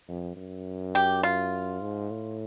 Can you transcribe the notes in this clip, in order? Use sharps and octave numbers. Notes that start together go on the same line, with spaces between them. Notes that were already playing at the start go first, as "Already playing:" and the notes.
F2
F#2
G4
F4
G#2
A2